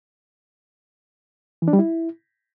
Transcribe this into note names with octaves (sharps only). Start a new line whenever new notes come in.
E3
D4
G3
E4